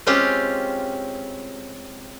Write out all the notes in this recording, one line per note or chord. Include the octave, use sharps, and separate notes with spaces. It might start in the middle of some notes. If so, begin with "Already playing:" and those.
G#3 C4 C#4 F4 G4